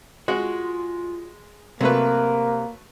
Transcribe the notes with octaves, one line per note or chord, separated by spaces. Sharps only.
G#3 F4 F#4
C3 F#3 A3 A#3 A#4 B4